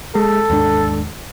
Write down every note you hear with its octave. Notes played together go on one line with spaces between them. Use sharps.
G#3 A4
D#2 G#2 D4